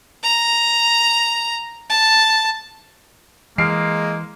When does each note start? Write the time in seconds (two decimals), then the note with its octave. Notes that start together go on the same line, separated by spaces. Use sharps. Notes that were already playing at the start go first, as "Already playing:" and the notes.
0.23 A#5
1.89 A5
3.58 E3 G#3 A#3 F6 C7 D7